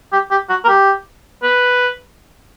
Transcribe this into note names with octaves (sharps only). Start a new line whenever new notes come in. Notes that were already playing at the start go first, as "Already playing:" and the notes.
G4
G4
F#4
A#4
G4
B4